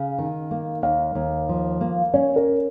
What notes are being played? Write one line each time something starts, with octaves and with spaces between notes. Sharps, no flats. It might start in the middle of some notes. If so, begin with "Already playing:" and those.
Already playing: C#3 F5
D#3
A#3
D#2 F5
D#2
F3
A#3
C#4 C#5
A#4